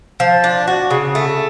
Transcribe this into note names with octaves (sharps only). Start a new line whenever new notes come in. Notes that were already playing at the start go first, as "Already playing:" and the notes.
F3
D4
F#4
C#3
A3